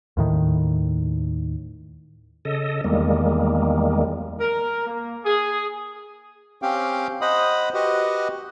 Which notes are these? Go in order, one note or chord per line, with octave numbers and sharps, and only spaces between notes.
D#2 A2 D#3
C#3 A4 D#5
E2 D#3 G3 G#3 A#3
A#4
A#3
G#4
C4 C#4 G4 F5 G5
C5 D#5 F#5 B5 D#6
F#4 G4 B4 D#5 F#5